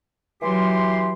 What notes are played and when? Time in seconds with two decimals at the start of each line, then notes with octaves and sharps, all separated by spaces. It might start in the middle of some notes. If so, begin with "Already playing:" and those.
0.43 E3 F#3 G4 C6